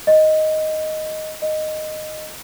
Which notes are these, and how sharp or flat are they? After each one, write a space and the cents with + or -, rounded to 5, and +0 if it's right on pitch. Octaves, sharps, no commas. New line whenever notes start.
D#5 +0
D#5 -10